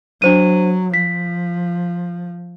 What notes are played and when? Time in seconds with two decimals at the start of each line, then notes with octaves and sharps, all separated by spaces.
0.22 F#3 D4 C5 D#7
0.94 F3 B6